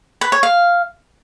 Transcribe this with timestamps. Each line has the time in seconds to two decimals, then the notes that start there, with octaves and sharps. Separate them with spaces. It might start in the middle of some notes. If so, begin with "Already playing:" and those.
0.21 B4
0.32 C#5
0.43 F5